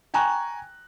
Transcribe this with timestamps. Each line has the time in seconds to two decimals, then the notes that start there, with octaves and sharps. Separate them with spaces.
0.14 G5 G#5 A#5 C#6 F#6